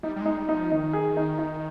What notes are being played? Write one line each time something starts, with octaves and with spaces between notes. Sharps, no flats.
G3 D#4
G3
G#3 D#4
G3
D#4
F3
D#3 D#4
G#4
D#4
D#4